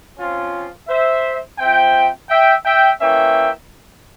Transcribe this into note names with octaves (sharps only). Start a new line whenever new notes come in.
F3 C4 C#4 F4
C5 E5
F3 C4 E5 G5
E5 G5
E5 G5
E3 A#3 C#4 E5 G5